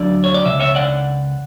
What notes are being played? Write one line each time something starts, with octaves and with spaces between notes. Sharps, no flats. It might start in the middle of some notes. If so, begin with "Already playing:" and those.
Already playing: D2 D3 F#3 D5
C#5
D5
C#2 C#3 E5
C#5 E5
D5 F#5